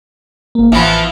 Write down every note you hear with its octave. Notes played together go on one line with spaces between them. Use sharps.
G1 A#3
A1 E3 F3 B3 B5